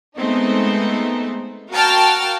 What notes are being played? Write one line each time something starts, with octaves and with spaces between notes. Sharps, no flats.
G#3 A3 B3 C4 D#4
F#4 A#4 F5 G5 A5 F6